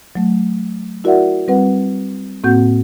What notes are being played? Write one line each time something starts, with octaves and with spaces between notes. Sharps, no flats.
F#3 A3
E4 F#4 A#4 D5 E5 F#5
G3 C4 B4 F#5
A2 A#3 C4 F#4 F#5 G6